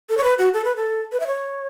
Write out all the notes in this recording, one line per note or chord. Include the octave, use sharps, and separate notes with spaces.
A4
C#5
B4
F#4
A4
B4
A4
B4
E5
C#5